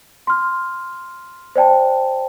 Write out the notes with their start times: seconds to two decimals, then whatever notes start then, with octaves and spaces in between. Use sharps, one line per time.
0.27 C6 F6
1.56 C5 D5 G5 A5